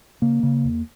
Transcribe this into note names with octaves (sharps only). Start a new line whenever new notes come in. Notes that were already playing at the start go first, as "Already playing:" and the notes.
C#3 A#3
C#3
E2